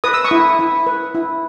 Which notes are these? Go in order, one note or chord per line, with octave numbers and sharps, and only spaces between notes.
B4 D#6
E6
C#6 D#6
E4
E4
B4
E4